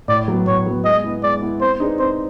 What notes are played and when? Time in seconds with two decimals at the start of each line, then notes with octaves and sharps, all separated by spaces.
0.08 A2 D5
0.28 F#3 B3
0.47 A2 C#5
0.67 F#3 B3
0.85 G#3 D#5
1.04 B3 E4
1.23 G#3 D5
1.42 B3 E4
1.61 C4 C5
1.80 D#4 G#4 B4 D5
1.99 C4 C5